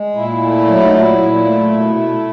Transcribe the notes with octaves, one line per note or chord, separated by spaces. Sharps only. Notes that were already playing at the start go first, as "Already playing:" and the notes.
Already playing: G#3
A#2 E4
A3
F#3
D#4
A#2 E4
A#2
A3
B2
A3